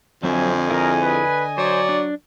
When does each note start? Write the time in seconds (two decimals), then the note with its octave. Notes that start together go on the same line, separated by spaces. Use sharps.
0.23 F2 D3 F#3 C4 D#5 E5 G#5
0.71 E4 G#4 A#4
1.01 B4
1.58 F#3 C5 D5
1.89 D4